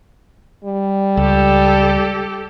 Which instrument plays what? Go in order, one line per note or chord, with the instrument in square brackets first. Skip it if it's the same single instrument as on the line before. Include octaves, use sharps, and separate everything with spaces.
[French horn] G3
[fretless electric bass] C#2 [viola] G4 A4